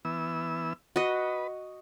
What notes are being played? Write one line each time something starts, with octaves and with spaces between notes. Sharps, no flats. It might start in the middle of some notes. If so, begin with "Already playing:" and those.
E3 B3 E6
F#4 B4 D#5